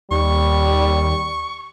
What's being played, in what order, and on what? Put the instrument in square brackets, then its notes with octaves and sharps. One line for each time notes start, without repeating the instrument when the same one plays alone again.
[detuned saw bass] D#2 [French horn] G3 [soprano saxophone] C#6